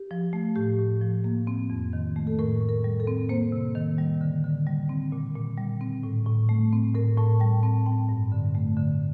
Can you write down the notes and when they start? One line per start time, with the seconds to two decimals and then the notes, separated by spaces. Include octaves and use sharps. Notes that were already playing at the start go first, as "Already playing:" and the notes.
Already playing: G4
0.11 F3
0.33 A3
0.56 A2 G4
0.79 A2
1.01 F3
1.24 A#3
1.47 C4
1.70 F2
1.93 D#3
2.16 A3
2.27 A4
2.39 A2 A#4
2.61 A2
2.69 A#4
2.84 G3
3.00 A4
3.07 C4
3.29 A#3 C5
3.52 C3
3.75 D#3
3.98 G3
4.21 D3
4.44 D3
4.67 G3
4.89 C4
5.12 A#2
5.35 A#2
5.58 G3
5.81 C4
6.03 A2
6.26 A2
6.49 A3
6.73 C4
6.95 A2 A#4
7.18 A2 A5
7.40 G3 G5
7.63 C4 A5
7.86 C4 G5
8.09 G2
8.32 D3
8.55 A3
8.77 D3